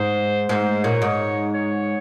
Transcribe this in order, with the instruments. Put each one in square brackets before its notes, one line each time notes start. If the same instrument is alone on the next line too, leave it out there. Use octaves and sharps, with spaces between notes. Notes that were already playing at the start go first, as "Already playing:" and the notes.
Already playing: [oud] G#2 [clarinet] C5
[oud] G#2 [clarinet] C5
[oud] A#2 [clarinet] C#5
[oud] G#2
[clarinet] C#5